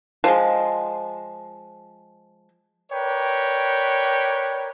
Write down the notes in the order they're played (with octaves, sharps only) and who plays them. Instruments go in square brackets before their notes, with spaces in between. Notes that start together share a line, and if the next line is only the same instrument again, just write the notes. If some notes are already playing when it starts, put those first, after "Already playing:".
[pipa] F3 G#3
[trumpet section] A#4 B4 C#5 D5 G5